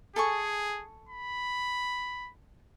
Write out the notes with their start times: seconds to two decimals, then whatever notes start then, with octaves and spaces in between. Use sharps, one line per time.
0.16 G#4 A4 G#5 C#6
1.09 B5